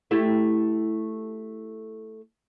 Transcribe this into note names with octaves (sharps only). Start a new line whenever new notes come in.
A3 E4 G4